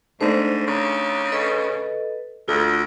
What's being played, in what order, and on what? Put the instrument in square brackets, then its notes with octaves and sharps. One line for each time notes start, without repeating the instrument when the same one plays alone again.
[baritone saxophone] G#2 [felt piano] A3 D4 D#4 [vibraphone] C5
[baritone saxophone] C#3 [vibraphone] A#5
[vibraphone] A4 B4 D#5
[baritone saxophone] D2 [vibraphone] F4 [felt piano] A4